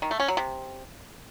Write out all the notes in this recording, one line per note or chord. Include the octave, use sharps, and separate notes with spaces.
D#3
A3
C#4
F#3
C3